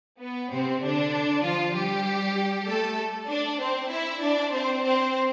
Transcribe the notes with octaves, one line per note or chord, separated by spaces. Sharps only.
B3
C3 C4
D3 D4
F3 F4
G3 G4
A3 A4
D4 D5
C4 C5
E4 E5
D4 D5
C4 C5
C4 C5